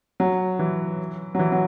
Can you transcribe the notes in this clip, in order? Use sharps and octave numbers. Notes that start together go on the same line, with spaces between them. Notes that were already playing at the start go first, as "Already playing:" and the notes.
F#3
E3
F#3
E3
F#3